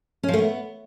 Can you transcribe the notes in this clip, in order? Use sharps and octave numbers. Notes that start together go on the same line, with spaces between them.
C#4
F3
A3
B3